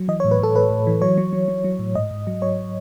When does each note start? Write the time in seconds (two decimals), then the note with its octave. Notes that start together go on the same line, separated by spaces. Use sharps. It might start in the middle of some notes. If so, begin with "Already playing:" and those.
Already playing: F#3
0.08 E3 D#5
0.20 C#5
0.24 A2
0.31 B4
0.39 A2 A4
0.55 A2 B4
0.70 A2
0.87 E3
1.01 F#3 C#5
1.18 F#3
1.33 F#3
1.48 F#3
1.64 F#3
1.79 A2
1.95 G#2 D#5
2.11 G#2
2.27 F#3
2.42 F#3 C#5